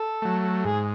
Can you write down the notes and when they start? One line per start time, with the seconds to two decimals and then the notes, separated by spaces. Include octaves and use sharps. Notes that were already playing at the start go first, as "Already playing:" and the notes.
Already playing: A4
0.22 F#3 A3
0.64 G#2 G#4